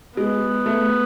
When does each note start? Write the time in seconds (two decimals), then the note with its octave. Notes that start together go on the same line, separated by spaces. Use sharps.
0.16 G#3 B3
0.66 A3